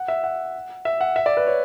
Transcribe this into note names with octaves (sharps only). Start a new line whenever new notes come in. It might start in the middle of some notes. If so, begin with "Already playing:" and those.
Already playing: F#5
E5
F#5
E5
F#5
E5
D5
B4
C#5